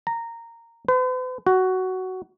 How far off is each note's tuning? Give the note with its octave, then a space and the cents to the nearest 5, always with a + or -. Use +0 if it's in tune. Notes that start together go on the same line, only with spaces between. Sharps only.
A#5 -10
B4 +45
F#4 +10